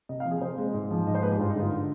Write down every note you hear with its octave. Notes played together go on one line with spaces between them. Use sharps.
C3 D#5
F5
F3
G#4
C3 C5
G#3
G#2
F3
G#2 D#5
C5
G#3 B4
G4
G2 F4
D#4
D3
F4